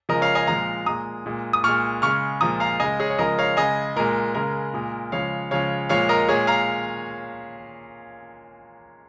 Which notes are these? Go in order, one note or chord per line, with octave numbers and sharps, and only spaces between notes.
C#3 F3 G#3 A#4 D#5
C#5 F5
D#5 G#5
A#2 F3 G#3 F5 A#5
A#2 G#3 A#5 D#6
A#2 G#3
D#6
A#2 G#3 C#6 F6
C#3 G#3 C#6 F6
A#2 F3 G#3 A#5 D#6
F5 A#5
C#3 G#3 D#5 G#5
G#4 C#5
C#5
C#3 F3 G#3 A#4 D#5
C#5 F5
C#3 G#3 D#5 G#5
A#2 G#3 A#4
C#3 G#3 A#4
A#2 G#3
C#3 F3 G#3 C#5 F5
C#3 F3 G#3 C#5 F5
A#2 F3 G#3 C#5 F5
A#4 D#5
A#2 G#3 G#4 C#5
F5 A#5